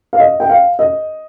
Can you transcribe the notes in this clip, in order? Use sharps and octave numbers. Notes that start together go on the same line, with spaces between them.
F5
D#5
G5
F5
D#5